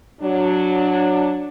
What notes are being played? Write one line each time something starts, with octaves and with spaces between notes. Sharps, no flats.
F#3 D4